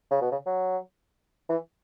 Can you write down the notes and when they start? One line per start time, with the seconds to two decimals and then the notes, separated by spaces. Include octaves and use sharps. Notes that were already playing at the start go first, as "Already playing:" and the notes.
0.11 C#3
0.21 B2
0.31 C#3
0.46 F#3
1.49 E3